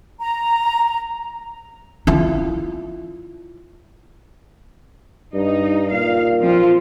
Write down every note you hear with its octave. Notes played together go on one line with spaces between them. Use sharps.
A#5
E4 F4
G2 D#4
A#2 F5
F3 C4 F4